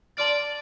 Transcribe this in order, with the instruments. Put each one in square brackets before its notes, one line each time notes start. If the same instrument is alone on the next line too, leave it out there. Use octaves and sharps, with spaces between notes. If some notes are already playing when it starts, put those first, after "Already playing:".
[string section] D5 [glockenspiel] A5 C6 F6 A6